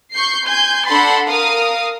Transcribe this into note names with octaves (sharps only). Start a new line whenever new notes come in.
C#6 G6 C7
G#5 C6 G6 G#6
D4 A4 F#5 B5 C6 A6
A#4 F5 D#6